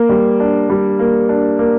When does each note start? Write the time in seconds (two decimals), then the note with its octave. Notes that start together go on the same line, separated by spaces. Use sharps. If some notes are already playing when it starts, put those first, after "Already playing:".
Already playing: A#3
0.09 G3
0.40 D4
0.70 G3
0.99 A#3
1.29 D4
1.59 A#3